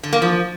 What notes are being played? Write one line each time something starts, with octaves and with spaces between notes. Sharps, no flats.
D3
A#3
F3